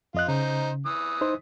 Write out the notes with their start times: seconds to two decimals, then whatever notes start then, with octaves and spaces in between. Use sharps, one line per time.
0.14 F2 F4 D#5 F#6
0.28 C#3 D#4 C5
0.86 E3 D#6
1.21 D#4 C5